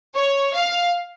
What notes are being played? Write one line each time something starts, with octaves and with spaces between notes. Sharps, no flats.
C#5
F5